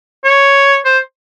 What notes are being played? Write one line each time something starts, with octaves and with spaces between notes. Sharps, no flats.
C#5
C5